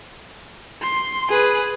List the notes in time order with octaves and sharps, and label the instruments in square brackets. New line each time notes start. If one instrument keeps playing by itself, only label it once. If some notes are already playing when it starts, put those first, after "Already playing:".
[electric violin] C6
G#4 B4